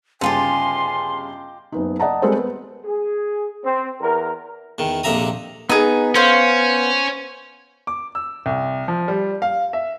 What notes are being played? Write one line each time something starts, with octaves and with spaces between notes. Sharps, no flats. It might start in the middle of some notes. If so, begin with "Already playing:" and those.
G1 C#3 D#4 F4 G4 G#5 A5 C6
F#1 B3 D#4
D5 D#5 F#5 A5 A#5
G3 G#3 C4 A4 A#4 C5
B3
G#4
C4
E2 A#4
E2 D#3
A#1 F2 C3 E5 A#5 D#6
B3 D#4 G#4
C#4 C5 F5
D6
E6
C2
F3
G3
F5
E5